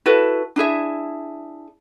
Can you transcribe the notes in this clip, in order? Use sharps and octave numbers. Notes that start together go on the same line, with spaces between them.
E4 F#4 A4 B4
D4 E4 G#4 E5